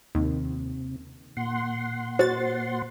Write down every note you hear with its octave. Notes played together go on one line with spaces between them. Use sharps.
D#2 C3
A#2 F#5 C6
F#4 C5 A6